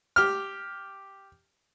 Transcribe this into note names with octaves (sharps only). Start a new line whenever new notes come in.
G4 F6